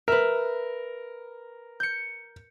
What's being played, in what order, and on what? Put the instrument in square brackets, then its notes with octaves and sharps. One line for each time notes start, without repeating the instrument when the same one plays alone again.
[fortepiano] A#4 [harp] B4 E5
[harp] G6 C#7